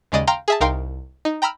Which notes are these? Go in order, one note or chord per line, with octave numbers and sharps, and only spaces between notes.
D#2 C#3 G#3 D5 D#5 D#7
F5 G5 A#5 C6
G#4 E5 A5
C2 D#4 A#4 F5 G5 C6
D#4
G5 A#5 B5 E6 F6